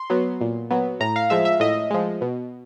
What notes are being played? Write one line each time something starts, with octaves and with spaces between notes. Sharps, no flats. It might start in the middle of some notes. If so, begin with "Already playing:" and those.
Already playing: C6
F#3 B3
A#2
F#3 B3
A2 A#5
F5
F3 G#3 E5
E5
A2 D#5
F3 G#3
B2